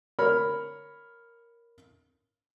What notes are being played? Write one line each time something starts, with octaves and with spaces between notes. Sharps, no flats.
A#4 C#5 B5 F6